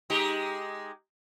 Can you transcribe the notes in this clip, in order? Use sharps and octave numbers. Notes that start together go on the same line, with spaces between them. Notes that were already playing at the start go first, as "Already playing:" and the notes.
G#3 D#4 G4